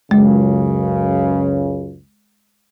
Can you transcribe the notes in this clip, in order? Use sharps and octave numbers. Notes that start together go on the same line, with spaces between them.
C#2 F#2 C#3 G#3